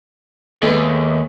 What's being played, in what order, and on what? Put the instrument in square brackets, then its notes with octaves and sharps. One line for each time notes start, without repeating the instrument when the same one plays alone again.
[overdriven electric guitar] D#2 [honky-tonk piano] G#3 A3 B3